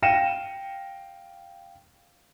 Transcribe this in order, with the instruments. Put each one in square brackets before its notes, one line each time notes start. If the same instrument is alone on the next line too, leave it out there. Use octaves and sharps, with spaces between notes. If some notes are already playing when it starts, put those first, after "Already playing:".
[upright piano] F5 G5 A#6 C#7 D#7 E7